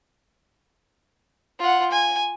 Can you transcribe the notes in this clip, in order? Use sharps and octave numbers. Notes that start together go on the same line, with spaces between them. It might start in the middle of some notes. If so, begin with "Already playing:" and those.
F4 F#5
G#5